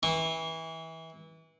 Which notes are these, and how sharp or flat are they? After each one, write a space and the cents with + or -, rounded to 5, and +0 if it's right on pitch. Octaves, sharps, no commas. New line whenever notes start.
E3 -25 C#6 -30